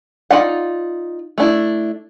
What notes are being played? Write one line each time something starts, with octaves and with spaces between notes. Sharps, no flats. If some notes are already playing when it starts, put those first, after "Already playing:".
D#4 F4 D5 F#5
A3 D4 E4